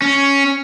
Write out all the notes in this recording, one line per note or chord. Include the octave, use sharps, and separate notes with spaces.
C#4